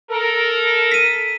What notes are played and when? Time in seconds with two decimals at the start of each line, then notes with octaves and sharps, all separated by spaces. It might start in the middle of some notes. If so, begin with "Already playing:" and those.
0.11 A4 A#4
0.92 B6 D#7